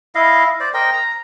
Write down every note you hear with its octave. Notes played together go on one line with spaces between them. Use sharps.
E4 D#5 F5
C5 D5
A#4 C5 D#5 G5
A#5